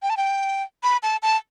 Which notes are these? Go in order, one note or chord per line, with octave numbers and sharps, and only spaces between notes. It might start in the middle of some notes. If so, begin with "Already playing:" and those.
G5
A5
G5
B5
A5
A5